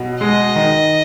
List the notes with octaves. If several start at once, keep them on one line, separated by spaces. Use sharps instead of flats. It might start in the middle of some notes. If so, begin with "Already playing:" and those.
Already playing: B2 F#3
G#3 D#5
D#3